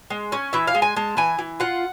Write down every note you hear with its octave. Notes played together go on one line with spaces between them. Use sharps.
G#3
C#4
E3 E5
F5
G#3
G#5
G#3 A5
E3 G#5
E3
F4 F#5